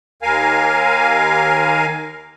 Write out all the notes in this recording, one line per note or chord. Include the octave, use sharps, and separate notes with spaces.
D#2 A#4 F5 G#5